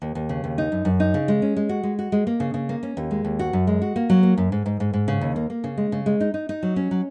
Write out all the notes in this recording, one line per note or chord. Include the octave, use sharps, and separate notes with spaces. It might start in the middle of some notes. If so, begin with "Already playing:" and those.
D#2
D#2
C#3
D#2
D#4
F#2
F#2
D#4
C#3
G#3
C#4
G#3
F#4
G#3
F#4
G#3
A#3
C#3
C#3
A#3
C#4
D#2
G#3
D#2
F#4
F#2
G#3
F#4
A#3
F#3
A#3
F#2
G#2
G#2
G#2
G#2
C#3
D#2
A#3
A#3
C#3
G#3
C#3
G#3
D#4
D#4
D#4
F#3
C#4
F#3